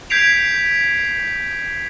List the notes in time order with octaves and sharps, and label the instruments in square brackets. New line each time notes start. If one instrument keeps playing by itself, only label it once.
[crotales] G6 G#6 B6 C7 D7 F7